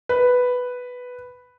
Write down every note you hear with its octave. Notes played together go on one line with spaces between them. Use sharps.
B4